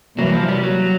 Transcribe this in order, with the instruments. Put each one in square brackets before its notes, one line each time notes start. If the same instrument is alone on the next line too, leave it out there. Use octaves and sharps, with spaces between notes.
[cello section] C3 E3 G3 A#3 [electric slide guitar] F#3
[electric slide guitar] F3
G3
F#3